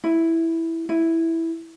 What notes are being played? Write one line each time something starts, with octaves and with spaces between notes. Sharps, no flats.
E4
E4